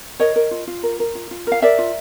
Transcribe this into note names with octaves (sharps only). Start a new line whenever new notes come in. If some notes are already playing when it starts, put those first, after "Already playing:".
A#4 C#5 D#5
A#4
F4
F4
A#4
A#4
F4
F4
A#4 F5
A#4 D5 E5
F4